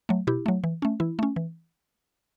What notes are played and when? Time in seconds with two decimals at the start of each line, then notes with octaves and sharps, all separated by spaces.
0.09 F#3 A3
0.27 B2 E4 G4
0.46 F#3 A3
0.64 E3
0.82 A3 C#4
1.00 E3 E4
1.19 A3 C#4
1.36 E3